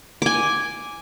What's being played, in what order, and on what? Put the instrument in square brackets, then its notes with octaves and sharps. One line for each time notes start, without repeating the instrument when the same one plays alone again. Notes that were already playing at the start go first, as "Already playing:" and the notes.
[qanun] G#5 D6